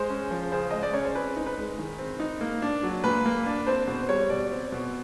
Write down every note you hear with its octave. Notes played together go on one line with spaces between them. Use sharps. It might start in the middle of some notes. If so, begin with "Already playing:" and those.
Already playing: G#3 C5
C#4
F3
C#3 C5
G#3 D#5
D5
C#4 C#5
C5
C4 B4
D#4
B4
G#3
D#3
C4
D#4
A#3
D4
F#3
A#2 B4
A#3
D4
C4 C5
B2 C5
G3 C#5
B2 D5
C4
B2